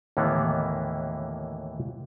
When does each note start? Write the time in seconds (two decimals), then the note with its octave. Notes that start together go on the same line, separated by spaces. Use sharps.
0.17 D#2 A2 D3 E3 A#3 B3